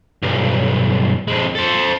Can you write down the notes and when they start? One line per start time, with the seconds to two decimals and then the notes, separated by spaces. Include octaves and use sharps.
0.23 B1 G2
1.28 F2 G#3
1.55 A4 C5